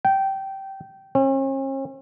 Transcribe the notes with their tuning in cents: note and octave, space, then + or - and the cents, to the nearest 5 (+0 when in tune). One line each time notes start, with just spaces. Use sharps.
G5 -15
C#4 -45